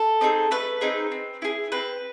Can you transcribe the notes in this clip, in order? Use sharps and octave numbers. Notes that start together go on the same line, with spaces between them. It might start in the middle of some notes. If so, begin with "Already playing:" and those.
Already playing: A4
C4 D#4 G#4
A3 B4
C4 D#4 G#4
C4
E4 G#4
C4 B4